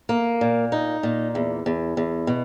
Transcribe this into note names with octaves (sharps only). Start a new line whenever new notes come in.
A#3
A#2
D#4
A#2
E2
E2
E2
B2